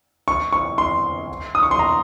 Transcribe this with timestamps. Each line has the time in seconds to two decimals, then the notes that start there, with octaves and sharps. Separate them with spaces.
0.28 C#6
0.53 C#6
0.78 C6
1.55 D#6
1.63 C#6
1.71 C6
1.79 A#5